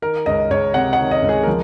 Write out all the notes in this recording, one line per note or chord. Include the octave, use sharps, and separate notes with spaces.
D#3 A#4
C#2 D#5
C#2 C#5
C3 F#5
F#5
D#3
D#5
C#2
G#4
F3 A#4